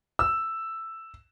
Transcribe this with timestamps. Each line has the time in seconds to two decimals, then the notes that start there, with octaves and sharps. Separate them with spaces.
0.19 E6